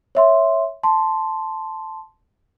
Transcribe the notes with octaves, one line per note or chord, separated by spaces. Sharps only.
C#5 E5 C6
A5 C6